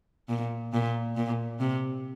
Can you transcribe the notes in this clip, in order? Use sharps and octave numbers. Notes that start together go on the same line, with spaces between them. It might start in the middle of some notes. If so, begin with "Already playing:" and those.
A#2
A#2
A#2
C3